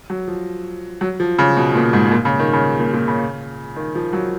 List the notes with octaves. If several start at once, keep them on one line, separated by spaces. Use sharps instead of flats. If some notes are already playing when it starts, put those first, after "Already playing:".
F#3
F3
F#3
F3
C#3
B2
A#2
G#2
A#2
C#3
D#3
C#3
A#2
A#2
C#3
D#3
F3
F#3